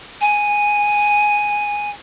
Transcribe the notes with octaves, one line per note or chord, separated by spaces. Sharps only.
G#5